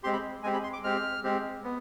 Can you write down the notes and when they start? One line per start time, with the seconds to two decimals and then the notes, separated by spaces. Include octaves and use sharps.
0.03 G#3 C4 G4 C6
0.13 B5
0.43 G#3 C4 G4 G#5
0.53 B5
0.64 C6
0.73 D6
0.83 G#3 C4 G4 F6
1.24 G#3 C4 G4
1.64 B3